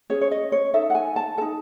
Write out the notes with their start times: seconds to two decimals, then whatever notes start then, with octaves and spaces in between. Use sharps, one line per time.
0.10 C#4 G#4 C#5
0.21 C#5
0.31 D#5
0.52 C#5
0.74 D#4 A4 E5
0.90 F#5
0.95 G#5
1.16 A5
1.37 D#4 A4 A5